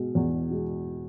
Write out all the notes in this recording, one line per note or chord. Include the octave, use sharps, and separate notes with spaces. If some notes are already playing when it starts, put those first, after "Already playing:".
Already playing: B2 G#3
E2
B2 G#3